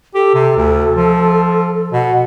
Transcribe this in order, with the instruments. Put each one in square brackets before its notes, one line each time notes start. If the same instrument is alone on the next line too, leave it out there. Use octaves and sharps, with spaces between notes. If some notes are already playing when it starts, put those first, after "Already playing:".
[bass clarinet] G4 [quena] A4
[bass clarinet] C3
D2
F3
[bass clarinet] B2 [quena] F#5